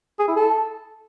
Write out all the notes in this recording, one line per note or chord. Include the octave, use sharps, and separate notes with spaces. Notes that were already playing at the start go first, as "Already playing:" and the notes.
G#4
E4
A4